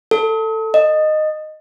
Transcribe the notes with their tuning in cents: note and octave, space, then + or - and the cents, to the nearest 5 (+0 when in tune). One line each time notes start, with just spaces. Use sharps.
A4 +15
D#5 -10